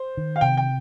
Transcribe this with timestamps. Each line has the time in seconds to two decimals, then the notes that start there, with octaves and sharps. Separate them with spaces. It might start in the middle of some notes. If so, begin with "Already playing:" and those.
Already playing: C5
0.17 D#3
0.36 F5
0.41 C3 G5
0.57 G5